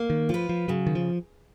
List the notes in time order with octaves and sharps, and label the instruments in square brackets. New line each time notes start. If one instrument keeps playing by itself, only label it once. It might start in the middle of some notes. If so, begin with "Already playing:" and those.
Already playing: [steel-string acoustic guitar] A#3
[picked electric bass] D#3
[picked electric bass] F3 [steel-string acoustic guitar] F4 B4
[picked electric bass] F3
[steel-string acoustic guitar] C#3 [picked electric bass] F#3
[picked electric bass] D#3
F3